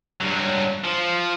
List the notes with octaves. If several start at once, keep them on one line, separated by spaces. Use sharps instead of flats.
G2 F#3
F3